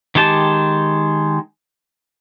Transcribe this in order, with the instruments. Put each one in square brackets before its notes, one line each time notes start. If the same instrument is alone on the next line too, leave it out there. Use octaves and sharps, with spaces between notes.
[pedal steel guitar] D#3 G#3 G4 A5